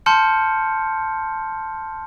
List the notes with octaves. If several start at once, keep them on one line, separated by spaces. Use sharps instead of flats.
A5 C6 F6 G6 C#7